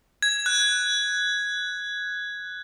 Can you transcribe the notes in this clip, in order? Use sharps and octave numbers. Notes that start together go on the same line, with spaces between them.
G#6
F#6